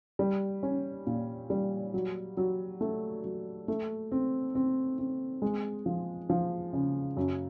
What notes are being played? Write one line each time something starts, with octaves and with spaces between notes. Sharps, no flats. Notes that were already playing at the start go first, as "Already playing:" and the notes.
G3
C#4
A#2
G3
F#3
F#3
A3
F#3
A3
C4
C4
C4
G#3
F3
F3
C#3
F#2